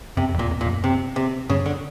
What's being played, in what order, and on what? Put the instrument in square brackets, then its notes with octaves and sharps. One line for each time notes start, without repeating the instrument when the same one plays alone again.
[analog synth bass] F#2 [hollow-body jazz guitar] C3
[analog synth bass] F2
[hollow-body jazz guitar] A#2
[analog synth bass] F2
[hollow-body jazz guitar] A#2
[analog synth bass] F#2
[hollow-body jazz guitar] C3
C3
[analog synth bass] G2 [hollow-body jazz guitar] C#3
[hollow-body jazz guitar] D3